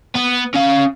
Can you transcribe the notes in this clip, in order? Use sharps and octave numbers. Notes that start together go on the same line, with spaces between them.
B3
C#4 F5